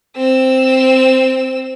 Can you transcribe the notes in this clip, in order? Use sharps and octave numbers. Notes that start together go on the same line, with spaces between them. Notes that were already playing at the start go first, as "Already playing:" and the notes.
C4 E6